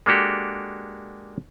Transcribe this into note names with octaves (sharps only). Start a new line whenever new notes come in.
G#3 A#3 D4 F#4 G4 A4